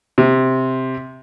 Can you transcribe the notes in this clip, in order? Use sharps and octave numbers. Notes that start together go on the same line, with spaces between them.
C3